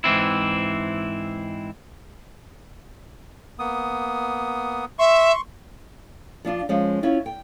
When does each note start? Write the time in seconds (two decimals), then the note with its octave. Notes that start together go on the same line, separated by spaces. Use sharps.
0.04 G#2 E3 C4 E4
3.59 A#3 B3 D#6
4.99 E5 C6 C#6
6.45 F3 D4 F4
6.69 F3 G#3 C#4
7.03 C#4 E4 F4
7.26 G5